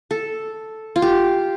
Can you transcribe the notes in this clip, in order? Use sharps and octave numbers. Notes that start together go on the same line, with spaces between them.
A4
F4
G4